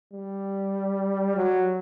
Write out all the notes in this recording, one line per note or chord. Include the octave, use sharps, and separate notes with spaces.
G3
F#3